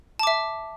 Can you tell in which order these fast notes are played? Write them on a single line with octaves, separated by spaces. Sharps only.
A5 D6 E5